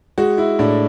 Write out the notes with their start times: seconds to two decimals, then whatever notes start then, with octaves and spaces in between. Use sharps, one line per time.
0.18 G#3 F#4
0.38 E4
0.59 A2 D4